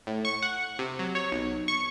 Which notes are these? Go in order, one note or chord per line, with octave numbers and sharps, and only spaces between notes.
A2
C#6
F#5
C3
F#3
C#5
B1
C#6